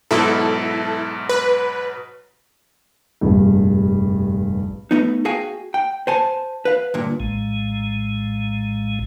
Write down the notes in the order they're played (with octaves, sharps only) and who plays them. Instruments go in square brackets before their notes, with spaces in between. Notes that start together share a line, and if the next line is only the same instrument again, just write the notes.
[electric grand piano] G#2 B2 F#3 [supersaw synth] E4 A4
[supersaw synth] B4
[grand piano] F1 A#1 G2
[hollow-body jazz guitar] A3 B3 D#4
F#4 G#4 F5 G5 G#5
G5
C5 G#5 A5
B4 F5
D2 G2 A#2
[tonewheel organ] A#1 A2 G#3